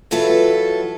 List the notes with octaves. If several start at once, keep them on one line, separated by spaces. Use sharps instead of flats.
E3 F#3 F4 A4 B4 E5